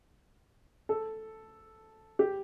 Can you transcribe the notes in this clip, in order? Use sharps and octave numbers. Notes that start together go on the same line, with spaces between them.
A4
G4